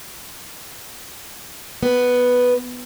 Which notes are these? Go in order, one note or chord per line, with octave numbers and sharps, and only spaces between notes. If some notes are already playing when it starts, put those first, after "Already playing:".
B3